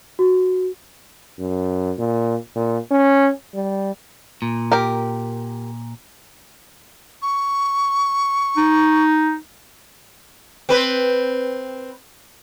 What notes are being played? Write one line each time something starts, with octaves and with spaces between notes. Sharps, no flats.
F#4
F#2
A#2
A#2
C#4
G3
A#2
G4 A#4
C#6
D#4
C4 B4